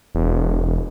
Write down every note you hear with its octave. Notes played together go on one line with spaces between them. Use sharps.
E1